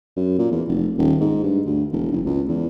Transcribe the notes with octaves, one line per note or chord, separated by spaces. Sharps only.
F#2
A#2
E2
F1
D#1
G#2
G2
D2
E1
F#1
C#2
E2